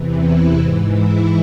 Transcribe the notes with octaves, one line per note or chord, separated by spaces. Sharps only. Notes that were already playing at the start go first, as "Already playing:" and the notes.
Already playing: E2 C3 E3
E4
G#2 E3 C4
E4